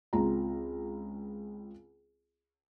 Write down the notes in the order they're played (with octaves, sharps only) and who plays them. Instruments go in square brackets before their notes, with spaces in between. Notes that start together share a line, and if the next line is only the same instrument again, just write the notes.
[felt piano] C#2 C4 F4 A#5